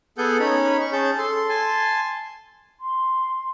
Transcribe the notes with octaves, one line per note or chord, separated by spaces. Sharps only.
B3 G#4 A4 F#5 G#5 G6
C#4 D#4 C#5 B5
C#6
C#4 G#4 A5 G6
A4 C6
G#5 A5 C6
C6